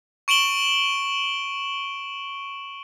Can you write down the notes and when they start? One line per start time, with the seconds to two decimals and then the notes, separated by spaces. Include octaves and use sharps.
0.28 C#6 D7 E7 F#7 G7